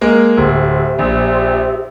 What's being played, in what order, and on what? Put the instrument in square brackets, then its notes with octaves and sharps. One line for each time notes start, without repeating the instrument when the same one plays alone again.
[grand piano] G#3 A#3
[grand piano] D1 [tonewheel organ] G4 C5 E5
[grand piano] A#1